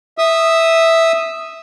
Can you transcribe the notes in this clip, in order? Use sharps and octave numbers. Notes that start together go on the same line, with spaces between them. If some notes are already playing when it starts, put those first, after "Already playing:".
E5 D#6 E6